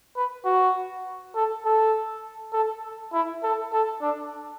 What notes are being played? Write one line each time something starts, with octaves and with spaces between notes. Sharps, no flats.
B4
F#4
A4
A4
A4
E4
A4
A4
D4